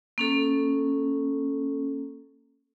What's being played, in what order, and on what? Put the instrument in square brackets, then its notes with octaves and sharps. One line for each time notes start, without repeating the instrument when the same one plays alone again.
[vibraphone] A#3 C#4 A4